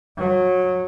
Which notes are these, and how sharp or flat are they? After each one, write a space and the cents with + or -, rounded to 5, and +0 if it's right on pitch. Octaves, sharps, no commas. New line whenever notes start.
F#3 -20